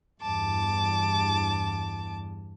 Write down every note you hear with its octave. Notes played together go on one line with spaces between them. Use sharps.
E2 G2 A5 D6